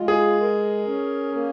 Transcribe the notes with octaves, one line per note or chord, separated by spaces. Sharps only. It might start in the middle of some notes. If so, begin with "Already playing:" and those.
Already playing: G#3 F4
G#4
A#4
C#4
A#3